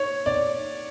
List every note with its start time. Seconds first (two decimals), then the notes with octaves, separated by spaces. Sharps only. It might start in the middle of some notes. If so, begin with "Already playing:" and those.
Already playing: C#5
0.26 D5